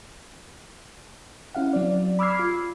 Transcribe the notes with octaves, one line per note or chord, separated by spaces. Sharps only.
C#4 E4 F5 F#5
F#3 C4 D5
B5 D6 E6 F6 G#6 C7
F4